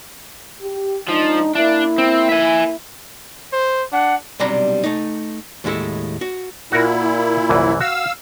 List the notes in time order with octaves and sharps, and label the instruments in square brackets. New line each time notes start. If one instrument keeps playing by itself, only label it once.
[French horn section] G4
[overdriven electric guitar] F3 [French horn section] G#3 D4 D#4
[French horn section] A#3 E4 [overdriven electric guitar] D4
[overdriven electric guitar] C4
E5 G#5
[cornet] C5
[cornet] D4 [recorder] F#5
[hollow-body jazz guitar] B1 C3 G3 D4 A#5 B5
A3 D#4
D#2 A2 G#3 E4 A4
F#4
[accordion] A#2 E4 [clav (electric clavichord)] F#4 A#4
[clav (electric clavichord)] C2 F#2 E3
[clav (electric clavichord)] F#4 [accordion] F5 E6